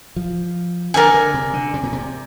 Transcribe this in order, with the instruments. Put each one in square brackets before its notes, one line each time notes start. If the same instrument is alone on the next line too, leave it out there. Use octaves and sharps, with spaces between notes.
[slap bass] F3
[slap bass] D3 [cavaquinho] A#4 D5 G#5
[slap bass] D3
C3
D3
C3
A#2
C3